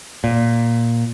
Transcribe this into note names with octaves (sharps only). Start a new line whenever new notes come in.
A#2